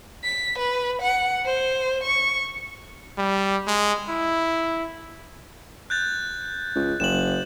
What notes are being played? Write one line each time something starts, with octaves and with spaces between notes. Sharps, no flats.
B6
B4
F#5
C5
C#6
G3
G#3
E4
F#6 G6 A6
C#2
F#1 E7 F#7